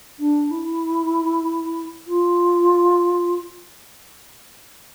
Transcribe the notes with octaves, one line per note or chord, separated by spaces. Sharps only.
D4
E4
F4